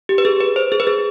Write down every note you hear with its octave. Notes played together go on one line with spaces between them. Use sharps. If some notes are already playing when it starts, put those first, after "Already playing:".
G4
B4
G#4
B4
C5
G#4
B4
G#4